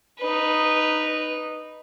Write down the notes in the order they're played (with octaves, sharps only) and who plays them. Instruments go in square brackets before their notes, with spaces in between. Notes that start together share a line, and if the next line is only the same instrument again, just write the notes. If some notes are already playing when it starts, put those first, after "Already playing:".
[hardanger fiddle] D#4 B4